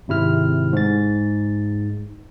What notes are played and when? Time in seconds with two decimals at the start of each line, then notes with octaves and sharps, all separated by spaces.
0.08 G#1 C3 E4 F6
0.73 G#2 A6